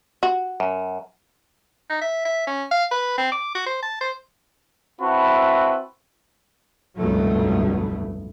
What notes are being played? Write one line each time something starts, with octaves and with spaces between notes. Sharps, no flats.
F#4
F#2
D#4
E5
E5
C#4
F5
B4
C4
D6
F#4
C5
A5
C5
C4 E4 F#4 B4 A5 B5
F1 C#2 G2 B2 F#3 A3